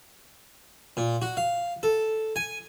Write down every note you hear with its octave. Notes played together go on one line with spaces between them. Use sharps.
A#2
F#4
F5
A4
G#5